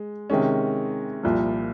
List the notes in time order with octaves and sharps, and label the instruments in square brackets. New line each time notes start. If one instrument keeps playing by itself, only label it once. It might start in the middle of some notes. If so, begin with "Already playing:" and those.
Already playing: [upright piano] G#3
C3 D#3 G#3 C#4
C2 A#2 F3